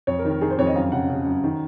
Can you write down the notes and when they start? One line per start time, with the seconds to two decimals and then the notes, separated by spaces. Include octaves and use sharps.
0.07 F2 C#5
0.19 A#4
0.25 D#3
0.31 A#4
0.41 D#3 G#4
0.50 C5
0.58 F2 C#5
0.67 D#5
0.75 F#2 F5
0.92 C#3 F#5
1.09 C#3
1.26 F#2
1.44 D#3